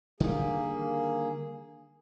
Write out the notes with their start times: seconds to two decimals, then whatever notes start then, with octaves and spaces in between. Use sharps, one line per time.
0.20 D3 D#3 G3 A#3 G#4